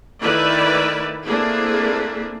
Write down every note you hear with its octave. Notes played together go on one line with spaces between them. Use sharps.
D#3 A3 E4 B4 D5 E5
A3 A#3 C4 D4 E4 G#4